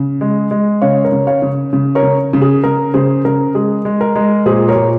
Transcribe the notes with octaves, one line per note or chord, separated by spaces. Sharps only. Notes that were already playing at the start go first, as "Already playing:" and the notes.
Already playing: C#3
G#3
G#3
C#3 C#5 F5
A#4 C#5
C#3
C#5 F5
C#3
C#3
A#4 C#5
C#3
C#3
G#4
C#3 A#4
C#3 G#4 C5
C#3 A#4
G#3 G#4
G#3
A#4
G#3
A#2 G#4 C5
A#4 C#5
A#2